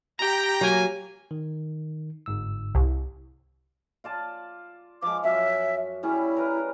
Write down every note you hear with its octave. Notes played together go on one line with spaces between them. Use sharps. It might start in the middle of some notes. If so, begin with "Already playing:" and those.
G4 G5 A#5
F#3 A#3 G#5
D#3
G1 G#2 E6
C2
F4 D5 A5
F3 G#3 D6
F#2 E5
G3 C#4 E4 G#4
A#4 B4